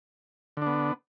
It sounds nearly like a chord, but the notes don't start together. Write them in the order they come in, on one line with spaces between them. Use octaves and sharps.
D3 D4 B3